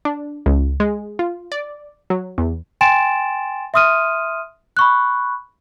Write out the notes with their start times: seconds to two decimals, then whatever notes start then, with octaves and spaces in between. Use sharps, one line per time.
0.05 D4
0.46 C#2
0.80 G#3
1.19 F4
1.52 D5
2.10 F#3
2.38 E2
2.81 G5 G#5 C6 A6 D7 E7
3.74 E5 C6 D#6 F6 D#7
4.77 B5 C#6 F#6